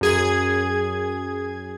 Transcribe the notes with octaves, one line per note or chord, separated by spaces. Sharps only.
F#2 G#4 G#6